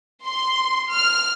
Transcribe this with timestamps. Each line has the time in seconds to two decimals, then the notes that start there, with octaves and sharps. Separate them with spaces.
0.23 C6
0.90 F6